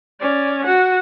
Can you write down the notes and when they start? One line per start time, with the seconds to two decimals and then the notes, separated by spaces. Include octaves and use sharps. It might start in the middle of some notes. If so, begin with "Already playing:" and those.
0.21 C#4 D5
0.65 F#4 F#5